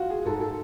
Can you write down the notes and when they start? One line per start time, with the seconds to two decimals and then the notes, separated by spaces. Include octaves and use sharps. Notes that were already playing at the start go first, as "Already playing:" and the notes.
Already playing: F4 F#4
0.10 G#4
0.25 G#2 A4
0.41 A4